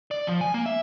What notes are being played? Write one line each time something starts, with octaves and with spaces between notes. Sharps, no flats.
D5
F3
G#5
A#3
E5